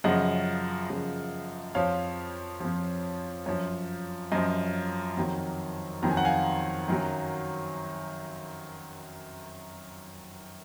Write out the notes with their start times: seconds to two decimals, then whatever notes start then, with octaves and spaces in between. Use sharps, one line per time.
0.04 F#2 C#3 F3 D#5 F#5
0.90 F#2 C#3 F3
1.75 F2 F3 C#5 F5
2.60 F2 F3
3.46 F#2 F3 C#5
4.32 F#2 F3 D#5
5.17 F2 D#3 F#3
6.02 F2 D#3 F#3 A#5
6.10 G#5
6.17 F#5
6.25 F5 G#5
6.88 F#2 D#3 F#3